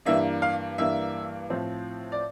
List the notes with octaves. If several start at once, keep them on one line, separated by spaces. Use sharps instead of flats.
G2 E3 A#3 D4 E5
F5
G2 E3 A#3 D4 E5
A2 F3 C4
D5